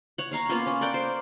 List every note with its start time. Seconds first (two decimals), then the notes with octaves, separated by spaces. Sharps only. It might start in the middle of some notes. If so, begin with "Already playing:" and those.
0.18 C#5 F#5
0.31 C#5 F5 A#5 C#6
0.49 A#3 B3 C#4 F4
0.67 C#4
0.81 A#4 D5 F#5 G5
0.94 C5